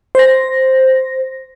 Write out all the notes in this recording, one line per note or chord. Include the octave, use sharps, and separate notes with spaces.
C5 A#6